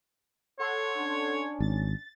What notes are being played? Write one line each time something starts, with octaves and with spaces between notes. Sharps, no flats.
A4 C#5 F#5 C6
C#4 D4
G#1 A6